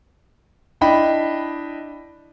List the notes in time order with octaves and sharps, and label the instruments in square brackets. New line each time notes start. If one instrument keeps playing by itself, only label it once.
[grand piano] D4 E4 D#5 G5 B5